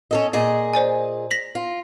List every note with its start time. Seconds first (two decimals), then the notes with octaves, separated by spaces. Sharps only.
0.11 C#4 A4 D#5
0.33 A#2 G#4 D#5
0.74 C5 D5 G#5
1.31 A#6 B6 F#7
1.55 F4